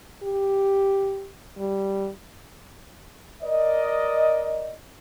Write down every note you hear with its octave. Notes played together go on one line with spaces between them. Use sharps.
G4
G3
A#4 D5 D#5